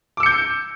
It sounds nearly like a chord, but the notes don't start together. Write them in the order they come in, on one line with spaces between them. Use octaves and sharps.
D6 E6 C#7 G6